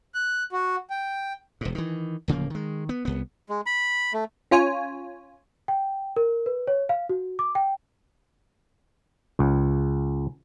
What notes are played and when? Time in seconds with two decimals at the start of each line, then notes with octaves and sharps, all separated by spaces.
0.15 F#6
0.52 F#4
0.90 G5
1.61 E1 G#2
1.75 D#3 E3
2.28 D1 C#3 F3 A#3
2.50 D#3 G#3
2.89 B3
3.05 C2 B3
3.49 G#3
3.66 B5
4.13 A3
4.51 C#4 F4 C#5 G#5
5.68 G5
6.16 A#4
6.46 B4
6.67 C#5
6.89 F5
7.09 F#4
7.39 D6
7.55 G5
9.39 C#2